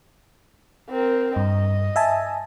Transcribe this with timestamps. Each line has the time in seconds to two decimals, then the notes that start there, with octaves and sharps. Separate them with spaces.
0.90 C4 A#4
1.36 G2 D#5
1.96 E5 G#5 A5